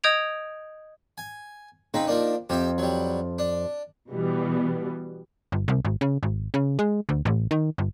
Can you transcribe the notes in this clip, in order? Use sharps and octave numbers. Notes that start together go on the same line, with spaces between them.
D#5 D#6 G6 G#6 D7 F7
G#5
C#3 C4 D#4 B5
F3 A#3 D4
F2 G4 E5
F#3 G3
D4
B2 E3 G3 B3
G1
C2
G#1
C#3
G#1
C#3
G#3
D2
A1
D#3
G1